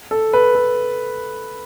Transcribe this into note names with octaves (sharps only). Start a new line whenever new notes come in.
A4
B4
A4